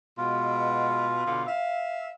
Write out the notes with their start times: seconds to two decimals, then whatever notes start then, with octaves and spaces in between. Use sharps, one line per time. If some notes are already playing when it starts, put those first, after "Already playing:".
0.18 B2 G#3 F4
1.26 B2 D3 F5
1.47 E5 F5